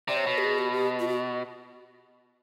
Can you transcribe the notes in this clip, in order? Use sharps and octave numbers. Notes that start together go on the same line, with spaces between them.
C3 D5
C#5
B2
G4
G#4
G4
G4
F4
F#4